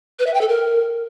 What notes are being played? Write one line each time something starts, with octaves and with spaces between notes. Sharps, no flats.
B4
E5
G5
A4
A#4